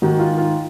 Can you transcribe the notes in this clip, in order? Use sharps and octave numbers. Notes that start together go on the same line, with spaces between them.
G#2 D#3 D#4 F#4
F4
F4